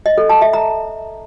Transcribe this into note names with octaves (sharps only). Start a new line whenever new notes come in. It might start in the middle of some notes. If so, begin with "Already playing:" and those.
D#5
A4
A5
E5
A#5